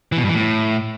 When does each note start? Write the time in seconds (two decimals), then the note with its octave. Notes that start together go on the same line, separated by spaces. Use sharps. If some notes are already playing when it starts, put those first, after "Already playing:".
0.12 E3
0.18 B2
0.23 G2
0.29 E3
0.35 A2